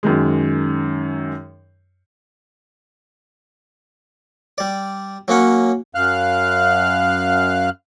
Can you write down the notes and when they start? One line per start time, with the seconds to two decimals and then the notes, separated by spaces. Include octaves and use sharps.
0.03 F#2 D#3 G#3
4.58 G3 D5
5.28 F#3 A#3 C#4 F#5
5.95 F#2 F5 F6 F#6